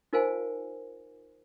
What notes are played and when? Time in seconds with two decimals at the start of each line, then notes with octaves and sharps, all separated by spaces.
0.13 D#4 F4 A#4 C5 F5 G#5